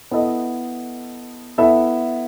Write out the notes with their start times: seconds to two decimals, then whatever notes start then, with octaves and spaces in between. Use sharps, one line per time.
0.11 B3 E4 A4 D#5
1.58 B3 E4 A4 E5